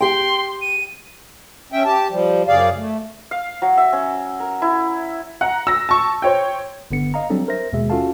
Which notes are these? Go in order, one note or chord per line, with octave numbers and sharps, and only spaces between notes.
G4 G5 C6
D#7
C#4 E5 G5
G4 A5
F3 G3
F#2 C#3 G#4 D5 F5
A3
F5
F#3
E5
C#4
A#4
E4
F#5 A#5
E6 A#6
A5 C#6
C5 C#5 G5
G1 D3 B3 C#7
D#5 F5 A#5
F#3 G3 C4 D4 A4
A#4 C5 E5 A#6
D#2 B2 G#3 G#4 E5
C#4 F4 F#4 A4 F5 A5